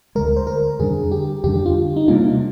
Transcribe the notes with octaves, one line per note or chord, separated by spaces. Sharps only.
D2 D3 G#3 A#4
C5
A#4
F2 D3 G3 D4 G#4
G4
F2 D3 G3 D4 G4
F4
D#4
C3 G3 A#3 D4 F4